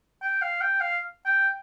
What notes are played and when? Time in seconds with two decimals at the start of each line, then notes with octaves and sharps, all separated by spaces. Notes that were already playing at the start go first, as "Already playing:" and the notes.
0.22 G5
0.42 F5
0.61 G5
0.81 F5
1.26 G5